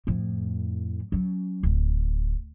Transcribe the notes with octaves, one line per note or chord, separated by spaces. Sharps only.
F2 A2
F#3 C#4
D1